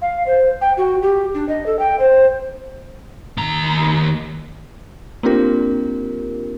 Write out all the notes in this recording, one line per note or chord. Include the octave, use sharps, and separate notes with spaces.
F5
C5
G5
F#4
G4
D4
D#5
A4
G5
C5
D#2 A#5
A#3 C4 D4 F4 G4 A#4